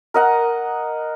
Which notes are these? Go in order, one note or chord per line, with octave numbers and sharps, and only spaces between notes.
A#4 D#5 F#5